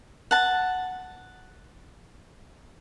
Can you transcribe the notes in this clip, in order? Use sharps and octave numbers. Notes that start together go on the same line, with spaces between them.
F#5 A5